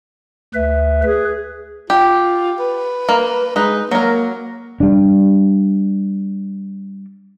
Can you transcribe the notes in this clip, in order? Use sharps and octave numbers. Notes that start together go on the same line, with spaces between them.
D2 B4 E5
G#4 B4
F4 G4
B4
A#3
G#3 D#4 B4
F#3 A#3 A#4
G3 D4